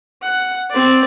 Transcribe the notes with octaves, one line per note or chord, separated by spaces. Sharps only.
F#5
C4 D5